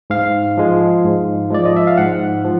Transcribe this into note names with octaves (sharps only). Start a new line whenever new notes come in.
G#2 F5
F3 G#3
G#2
F3 G#3 D5
D#5
E5
F5
G#2 F#5
F3